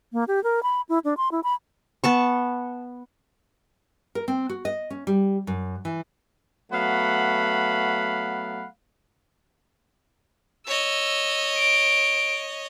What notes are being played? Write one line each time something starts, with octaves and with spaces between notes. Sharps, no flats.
A#3
G4
A#4
B5
E4
D4
C6
E4
B5
B3 A5 C#6
A#4
C4
F#4
D#5
C#4
G3
F#2
E3
F#3 A3 B3 F5 F#5 B5
C#5 D#5 E6
D7